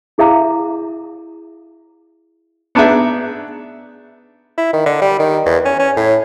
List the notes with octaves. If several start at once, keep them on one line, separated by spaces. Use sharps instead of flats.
E4 G#4 E5 F5 A#5 D6
B3 D4 D#4 G#4 E5
E4
D#3
D3
G3
D#3
E2
C#4
C#4
A2